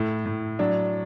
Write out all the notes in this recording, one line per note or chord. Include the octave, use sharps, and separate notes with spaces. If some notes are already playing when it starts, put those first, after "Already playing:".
Already playing: A2 E4
A2
F#3 D4